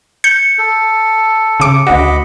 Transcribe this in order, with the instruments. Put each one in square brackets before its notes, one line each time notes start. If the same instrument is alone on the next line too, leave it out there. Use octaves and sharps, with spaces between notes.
[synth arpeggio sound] G6 [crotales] C#7
[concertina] A4
[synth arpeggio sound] C#3 D6
[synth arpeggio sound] D2 F#4 [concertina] D#5 B5 D6